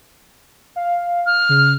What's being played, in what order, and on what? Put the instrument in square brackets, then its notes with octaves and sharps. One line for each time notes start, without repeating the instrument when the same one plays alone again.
[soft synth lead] F5
[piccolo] F6
[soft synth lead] C#3